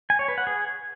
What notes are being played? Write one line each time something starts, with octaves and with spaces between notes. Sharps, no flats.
G#5
C#5
B4
F#5
G#4